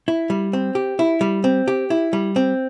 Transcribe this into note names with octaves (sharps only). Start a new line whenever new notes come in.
E4
G3
C4
G4
E4
G3
C4
G4
E4
G3
C4